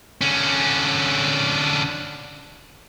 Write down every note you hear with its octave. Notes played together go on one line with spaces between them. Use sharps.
D3 C#4